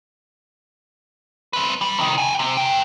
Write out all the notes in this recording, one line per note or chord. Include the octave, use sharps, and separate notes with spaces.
C4 B4
G3
C3 D#3
G5 G#5
C3
B4 G5